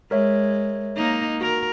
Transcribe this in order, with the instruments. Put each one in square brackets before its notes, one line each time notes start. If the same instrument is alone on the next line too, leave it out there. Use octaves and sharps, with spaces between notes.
[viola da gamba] G#3 [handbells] A#4 C#5 E5
[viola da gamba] A#3 D#4
[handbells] F#4 [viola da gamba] A#4